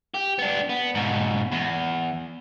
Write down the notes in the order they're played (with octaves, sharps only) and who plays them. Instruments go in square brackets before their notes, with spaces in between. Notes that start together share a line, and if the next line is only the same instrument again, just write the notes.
[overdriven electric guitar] G4
B3 D4
B3
G#2 B2
E2